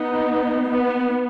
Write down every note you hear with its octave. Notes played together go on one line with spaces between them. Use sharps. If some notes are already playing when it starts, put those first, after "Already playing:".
Already playing: B3 D#4
B3